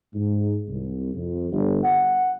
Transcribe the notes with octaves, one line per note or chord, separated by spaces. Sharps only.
G#2
C2
F2
G1
F#5